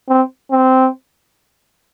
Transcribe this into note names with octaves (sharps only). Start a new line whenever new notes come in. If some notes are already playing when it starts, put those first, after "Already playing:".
C4
C4